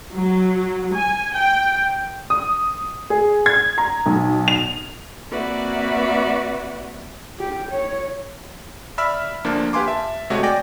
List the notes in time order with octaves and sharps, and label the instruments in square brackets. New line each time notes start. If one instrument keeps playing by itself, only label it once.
[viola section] F#3
G#5
G5
[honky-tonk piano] D#6
G#4
G#6
A#5
B1
F7
[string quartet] A#3 C4 F#4 B4 D5 E5
[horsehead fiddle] G4
C#5
[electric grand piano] D5 E5 B5 E6 F6 B6
D2 F3 A#3 D4
G4 B4 F5 G#5 C6 D6
E5 A5
C3 G#3 A3 F#4 C#5 D#5
D5 G5 G#5 D6 A#6